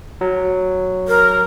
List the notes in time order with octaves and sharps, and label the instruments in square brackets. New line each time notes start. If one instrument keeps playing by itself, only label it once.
[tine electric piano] F#3
[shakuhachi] A#4